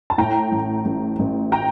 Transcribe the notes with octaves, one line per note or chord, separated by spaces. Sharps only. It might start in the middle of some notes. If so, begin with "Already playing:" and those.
A5
A2 G5 A#5
A1
A1
A1
G5 A#5